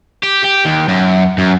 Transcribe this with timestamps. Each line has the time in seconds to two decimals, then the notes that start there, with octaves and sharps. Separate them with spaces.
0.23 G4
0.44 G4
0.65 D#2
0.88 F#2
1.38 F#2